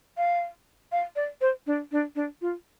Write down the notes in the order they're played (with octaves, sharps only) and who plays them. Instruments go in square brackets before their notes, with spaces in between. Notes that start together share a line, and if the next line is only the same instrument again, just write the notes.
[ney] F5
F5
D5
C5
D4
D4
D4
F4